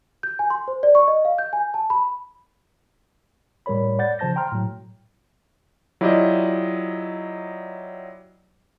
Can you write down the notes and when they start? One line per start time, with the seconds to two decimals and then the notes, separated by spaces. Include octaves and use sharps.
0.23 G6
0.39 G#5
0.50 C6
0.68 C5
0.83 D5
0.95 C#6
1.08 D#5
1.25 F5
1.38 G6
1.53 G#5
1.74 A5
1.90 B5
3.66 A2 G3 A#4 C#5 B5
3.99 D5 F#5 G6 A6
4.19 C#3 F3 C5 A5 G6 A#6
4.36 G5 A#5 C6 F6
4.52 A2 F#3
6.01 F#3 E4 F4 G4 D5 D#5